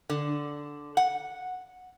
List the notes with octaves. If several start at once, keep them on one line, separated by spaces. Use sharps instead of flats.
D3
F#5